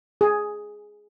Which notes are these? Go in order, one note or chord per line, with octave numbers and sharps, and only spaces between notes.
G#4